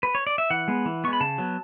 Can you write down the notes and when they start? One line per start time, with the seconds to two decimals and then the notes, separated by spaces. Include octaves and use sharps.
0.03 B4
0.15 C#5
0.27 D5
0.38 E5
0.50 E3 F#5
0.68 G#3 B3
0.86 E3
1.04 B3 C#6
1.08 G#3
1.13 B5
1.20 C#3 A5
1.38 F#3 B3